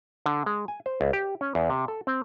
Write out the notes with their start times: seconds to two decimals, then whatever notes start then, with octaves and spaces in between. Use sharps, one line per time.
0.26 D3
0.46 G#3
0.68 G#5
0.86 C5
1.01 C#2
1.13 G4
1.41 C#4
1.55 E2
1.70 C3
1.88 A4
2.07 C4